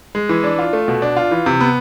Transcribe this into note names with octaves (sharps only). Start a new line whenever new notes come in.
G#3
E3
D4
F4
A3
B2
D4
F4
E3
C3
B3